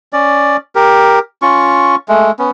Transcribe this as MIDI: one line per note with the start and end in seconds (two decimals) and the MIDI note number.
0.13 0.57 61
0.13 0.57 74
0.75 1.19 67
0.75 1.19 70
1.42 1.95 61
1.42 1.95 65
1.42 1.95 85
2.08 2.31 56
2.08 2.31 57
2.39 2.51 59
2.39 2.51 61